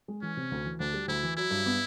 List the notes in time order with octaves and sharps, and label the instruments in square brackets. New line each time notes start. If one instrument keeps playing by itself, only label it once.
[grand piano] G#3
[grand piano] E3 [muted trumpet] C#4
[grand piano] C3
D2
E3
[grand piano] D2 [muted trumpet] D4
[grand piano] G3
[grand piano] D2 [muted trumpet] E4
[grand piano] E3
[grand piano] F#3 [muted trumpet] E4
[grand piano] G2
B3